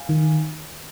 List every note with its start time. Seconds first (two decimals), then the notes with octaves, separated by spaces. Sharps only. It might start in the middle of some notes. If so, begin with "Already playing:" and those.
Already playing: F5 G#5
0.09 D#3